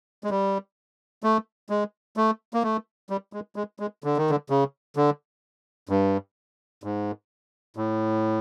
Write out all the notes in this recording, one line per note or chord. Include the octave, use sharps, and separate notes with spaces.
G#3
G3
A3
G#3
A3
A#3
A3
G3
G#3
G#3
G#3
D3
D#3
D3
C#3
D3
G2
G#2
A2